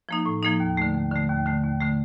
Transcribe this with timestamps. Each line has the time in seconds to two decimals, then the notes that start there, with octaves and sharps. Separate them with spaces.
0.09 F3 A#3 D#4
0.26 A2
0.43 F3 A#3 D#4
0.60 D#2
0.77 D3 A3
0.95 D#2
1.11 D3 A3
1.29 D#2
1.46 D3 A3
1.63 D#2
1.81 D3 A3